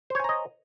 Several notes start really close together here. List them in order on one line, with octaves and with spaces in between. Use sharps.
C5 C#5 G#5 A#5 D#5